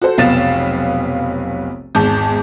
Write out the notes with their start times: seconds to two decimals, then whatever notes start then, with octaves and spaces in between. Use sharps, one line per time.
0.02 F#4 A4 C5
0.18 F1 B1 B3 F5 A6 E7
1.95 G#1 E2 G#2 A5 G6